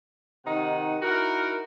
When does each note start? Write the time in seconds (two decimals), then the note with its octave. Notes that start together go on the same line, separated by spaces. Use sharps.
0.46 C3 D#3 D#4 F#5
1.02 D#4 E4 F#4 A#4